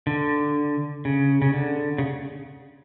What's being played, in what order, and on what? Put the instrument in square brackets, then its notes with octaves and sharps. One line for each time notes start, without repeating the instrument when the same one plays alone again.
[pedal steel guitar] D3
C#3
C#3
D3
C#3